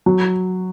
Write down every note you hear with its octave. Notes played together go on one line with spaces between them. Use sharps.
F#3